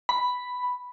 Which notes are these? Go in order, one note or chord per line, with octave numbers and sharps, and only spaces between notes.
B5